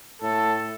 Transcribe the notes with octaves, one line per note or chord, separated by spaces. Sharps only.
A2 A4